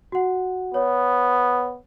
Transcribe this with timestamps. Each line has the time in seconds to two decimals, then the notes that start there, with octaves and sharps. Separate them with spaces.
0.12 F#4 F#5
0.74 B3 C#5